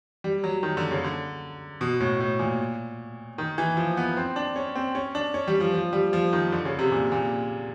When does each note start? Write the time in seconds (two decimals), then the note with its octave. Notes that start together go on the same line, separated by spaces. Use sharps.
0.24 G3
0.44 F#3
0.63 D#3
0.77 D3
0.91 C#3
1.04 D3
1.81 B2
2.00 A2
2.20 A2
2.39 A#2
3.38 D#3
3.58 E3
3.77 F3
3.97 B3
4.17 C4
4.36 D4
4.56 C#4
4.75 C4
4.95 C#4
5.15 D4
5.34 C#4
5.48 G3
5.60 F3
5.74 F3
5.93 G3
6.13 F3
6.33 D#3
6.52 D3
6.65 C#3
6.79 C3
6.92 A#2
7.12 A#2